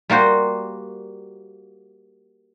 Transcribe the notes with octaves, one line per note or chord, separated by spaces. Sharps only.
G3 A#3 F#4 C5